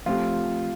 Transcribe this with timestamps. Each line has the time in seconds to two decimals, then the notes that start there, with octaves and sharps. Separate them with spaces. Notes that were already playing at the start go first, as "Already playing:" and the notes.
0.06 F3 A3 C4 F4 G4